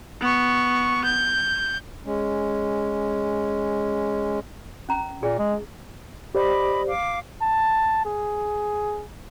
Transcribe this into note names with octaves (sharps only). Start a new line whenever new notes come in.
B3 C#6
G6
G#3 C#4
C#4 A#5
A#2 G#4
G#3
G4 C5 D5 D#5 B5 D6
F5 D6
A5
G#4